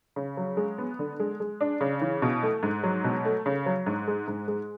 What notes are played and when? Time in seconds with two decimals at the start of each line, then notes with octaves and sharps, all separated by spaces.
0.16 C#3
0.37 F#3
0.57 G#3
0.78 B3
0.99 D3
1.20 G#3
1.40 G#3
1.61 D4
1.81 C#3
2.01 E3
2.22 B2
2.43 A3
2.63 G#2
2.84 F#3
3.04 B2
3.25 A3
3.46 C#3
3.66 F#3
3.86 G#2
4.07 G#3
4.28 G#2
4.48 G#3